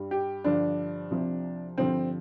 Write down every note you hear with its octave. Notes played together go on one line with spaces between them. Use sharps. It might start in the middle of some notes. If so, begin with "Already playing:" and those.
Already playing: G2 G3
G4
G2 D3 F3 D4
C2 C3 F3
G2 D3 F3 C4